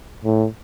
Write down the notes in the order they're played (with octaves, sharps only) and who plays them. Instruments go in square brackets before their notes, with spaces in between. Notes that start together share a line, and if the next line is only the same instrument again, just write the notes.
[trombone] A2